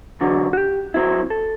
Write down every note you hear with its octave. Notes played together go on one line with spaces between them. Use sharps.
E2 D3 F#3
F#4
G4
F#2 F#3 C4 E4
A4